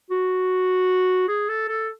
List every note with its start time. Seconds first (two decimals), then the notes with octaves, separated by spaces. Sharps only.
0.11 F#4
1.28 G#4
1.49 A4
1.68 A4